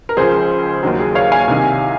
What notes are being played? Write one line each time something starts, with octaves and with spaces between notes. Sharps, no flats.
A#4
C#2 C#3 F3 G#4 C5
D#2 D#3 F#3
G#4
C#5 F5
F5 G#5
C2 C3 D#3